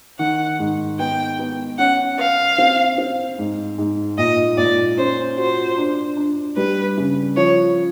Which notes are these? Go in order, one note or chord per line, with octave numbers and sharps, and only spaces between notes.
D#3 F#5
G#2
B3 G5
B3
C#4 F#5
B4 F5
C4
C4
G#2
G#2
A#2 D#5
A#2 D5
C#4 C5
F#4 C5
D4
D4
G3 B4
C#3
F3 C#5